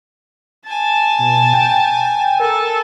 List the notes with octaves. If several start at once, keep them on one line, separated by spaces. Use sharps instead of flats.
G#5 A5
B2
G5
A4 A#4